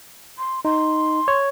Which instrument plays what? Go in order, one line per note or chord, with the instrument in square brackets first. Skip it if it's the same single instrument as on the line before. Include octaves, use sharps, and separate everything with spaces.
[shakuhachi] C6
[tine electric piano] D#4 [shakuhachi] C6
[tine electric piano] C#5